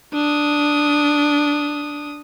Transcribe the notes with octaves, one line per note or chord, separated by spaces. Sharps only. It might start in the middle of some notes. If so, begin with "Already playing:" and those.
D4 D#6